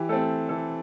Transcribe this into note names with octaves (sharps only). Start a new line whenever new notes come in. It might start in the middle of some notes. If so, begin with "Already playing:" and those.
Already playing: E3 G4
A3 C4 A4
E3 A4